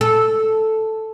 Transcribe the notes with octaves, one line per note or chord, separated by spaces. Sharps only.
A4